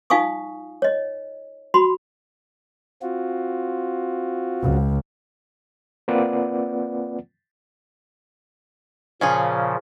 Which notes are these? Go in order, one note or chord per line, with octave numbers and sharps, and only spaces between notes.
D#4 F4 F5 G#5 C#6 D#6
C#5 D#5
F#4 B5 C6
C4 F4 F#4
C#2
A#3 C4 F4 B4 D5 F#5
A#2 C#3 F3 C#4 F4 G#4